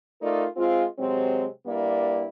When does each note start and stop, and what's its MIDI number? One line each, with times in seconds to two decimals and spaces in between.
0.21 0.45 57
0.21 0.45 63
0.21 0.45 65
0.21 0.45 70
0.21 0.45 74
0.57 0.84 56
0.57 0.84 60
0.57 0.84 65
0.99 1.46 48
0.99 1.46 54
0.99 1.46 56
0.99 1.46 60
1.66 2.26 43
1.66 2.26 58
1.66 2.26 64
1.66 2.26 74